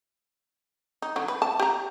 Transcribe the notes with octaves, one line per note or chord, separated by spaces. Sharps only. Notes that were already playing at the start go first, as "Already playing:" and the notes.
D#4
D3 F#3
B4
A5
G4 A#5